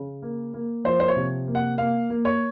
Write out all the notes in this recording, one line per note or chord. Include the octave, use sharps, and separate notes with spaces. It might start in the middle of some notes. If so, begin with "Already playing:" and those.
Already playing: C#3
A#3
A#3
F3 C5
C5
C#5
C3
A#3
F#5
A#3 F5
A#3
C#5